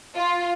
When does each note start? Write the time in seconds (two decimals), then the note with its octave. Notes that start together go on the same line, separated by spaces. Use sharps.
0.17 F4